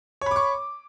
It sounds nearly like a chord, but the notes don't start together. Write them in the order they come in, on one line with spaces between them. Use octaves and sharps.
C#5 B5 D6 C#6